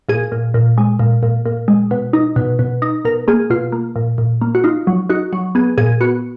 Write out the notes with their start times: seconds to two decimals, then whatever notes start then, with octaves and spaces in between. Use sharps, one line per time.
0.09 A#2 G#4
0.32 A#2
0.54 A#2
0.78 G#3
0.99 A#2
1.23 A#2
1.46 A#2
1.68 G#3
1.91 B2
2.13 D#4
2.36 B2
2.59 B2
2.82 D#4
3.05 B2 A#4
3.28 A#3 G#4
3.50 B2 F4
3.72 A#3
3.96 A#2
4.18 A#2
4.42 A#3
4.55 F#4
4.64 D#4 F4
4.87 F#3
5.10 D#4 F#4
5.33 F#3
5.55 B3 G#4
5.78 A#2 G#4
6.01 B3 F#4